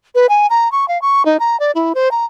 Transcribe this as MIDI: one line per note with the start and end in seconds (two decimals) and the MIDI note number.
0.15 0.27 71
0.29 0.47 80
0.50 0.71 82
0.72 0.88 85
0.88 1.00 77
1.02 1.25 85
1.25 1.37 63
1.40 1.59 82
1.60 1.71 74
1.75 1.93 64
1.95 2.11 72
2.11 2.25 82